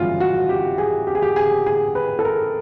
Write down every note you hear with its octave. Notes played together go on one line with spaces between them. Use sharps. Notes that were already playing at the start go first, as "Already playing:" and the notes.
Already playing: G1 F#2 C#3 E3 G3 F4 F#4
F#4
G4
G#4
G4
G#4
G4
G#4
G#4
B4
A4
A#4